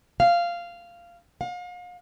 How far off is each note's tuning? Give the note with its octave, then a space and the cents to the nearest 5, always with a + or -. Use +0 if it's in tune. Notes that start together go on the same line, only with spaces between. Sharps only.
F5 -10
F5 +40